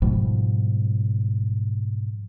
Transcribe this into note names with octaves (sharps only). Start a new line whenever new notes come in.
G#2 B2 F3 G3